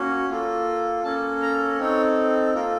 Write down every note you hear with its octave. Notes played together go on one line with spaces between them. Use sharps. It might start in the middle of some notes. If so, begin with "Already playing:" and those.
Already playing: A#3 C#4 F#4
A#3 F4 A4
A#3 C#4 A4 A5
A#5
C4 D#4 A4 C#5
A#3 F4 A4 A#4